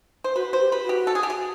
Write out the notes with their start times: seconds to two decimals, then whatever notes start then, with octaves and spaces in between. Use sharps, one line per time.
0.24 C5
0.36 F#4 B4
0.53 C5
0.60 G4
0.72 B4
0.84 F#4
0.89 G4
1.07 A4
1.15 G#4
1.23 G4
1.30 G#4